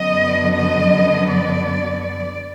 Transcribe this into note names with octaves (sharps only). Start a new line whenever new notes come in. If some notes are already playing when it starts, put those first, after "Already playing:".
Already playing: F#2 D3 F#3 B3 D#5
D#5
D5
D5